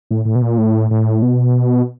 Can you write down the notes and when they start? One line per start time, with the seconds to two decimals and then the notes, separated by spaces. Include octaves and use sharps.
0.11 A2
0.25 A2
0.35 B2
0.42 A#2
0.58 A2
0.91 A2
1.22 B2